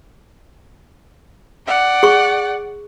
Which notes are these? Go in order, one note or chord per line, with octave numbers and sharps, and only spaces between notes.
D5 F#5
G#4 C#6